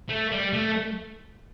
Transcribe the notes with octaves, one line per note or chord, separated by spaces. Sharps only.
A3
G3
A3